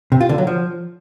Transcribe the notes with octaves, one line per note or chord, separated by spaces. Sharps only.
C3
F4
D3
F#3
F3